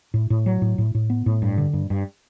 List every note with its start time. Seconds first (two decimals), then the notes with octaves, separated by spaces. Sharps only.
0.14 A2
0.30 A2
0.46 F#3
0.62 A2
0.78 A2
0.95 A2
1.10 B3
1.26 A2
1.42 G2
1.58 D3
1.73 G2
1.90 G2